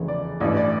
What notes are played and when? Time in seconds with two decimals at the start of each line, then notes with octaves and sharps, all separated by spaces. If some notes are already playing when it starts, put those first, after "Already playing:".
Already playing: F1 E2 C#3 E3
0.08 D5
0.40 A1 G2 E3 D5
0.57 D5